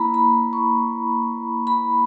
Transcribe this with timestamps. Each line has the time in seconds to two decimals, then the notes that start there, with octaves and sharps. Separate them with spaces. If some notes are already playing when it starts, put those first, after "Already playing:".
Already playing: A#3 E4 A#5 B5
0.14 B5
0.53 C#6
1.67 B5